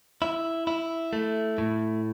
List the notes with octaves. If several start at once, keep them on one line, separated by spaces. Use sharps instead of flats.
E4
E4
A3
A2